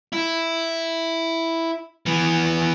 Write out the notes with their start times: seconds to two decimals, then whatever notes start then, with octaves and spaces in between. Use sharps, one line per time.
0.13 E4
2.06 E3 B3